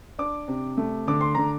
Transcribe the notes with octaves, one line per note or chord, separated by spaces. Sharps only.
D4 D6
C3
A3
D3 D6
C6
D3 A#5